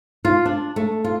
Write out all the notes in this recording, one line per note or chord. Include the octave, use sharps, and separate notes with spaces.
F4
D4
A3
F4